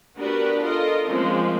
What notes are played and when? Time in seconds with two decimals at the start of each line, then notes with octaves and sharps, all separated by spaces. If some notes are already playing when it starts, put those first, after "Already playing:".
0.17 B3 D4 F#4 G4 A#4 B4
0.61 F4 A4 A#4 D#5
1.06 F3 G#3 A#3 C4 C#4 A#4